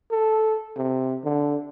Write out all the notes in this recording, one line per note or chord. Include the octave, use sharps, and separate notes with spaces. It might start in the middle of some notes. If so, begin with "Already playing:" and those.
A4
C3
D3